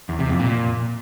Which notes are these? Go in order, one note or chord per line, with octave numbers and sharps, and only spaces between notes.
E2
C3
F2
A#2